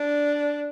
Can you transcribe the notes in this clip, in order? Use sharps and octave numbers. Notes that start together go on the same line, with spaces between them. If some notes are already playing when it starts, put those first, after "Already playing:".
Already playing: D4